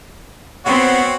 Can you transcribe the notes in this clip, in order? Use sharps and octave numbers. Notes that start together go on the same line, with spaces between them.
B3 C4 F#4 C#5